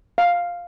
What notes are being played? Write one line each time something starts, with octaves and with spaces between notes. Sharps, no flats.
F5